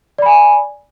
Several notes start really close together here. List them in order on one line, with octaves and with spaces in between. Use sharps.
D5 B5 G#5